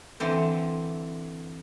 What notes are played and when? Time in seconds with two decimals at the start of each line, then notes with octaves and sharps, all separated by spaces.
0.20 D3 E3 C4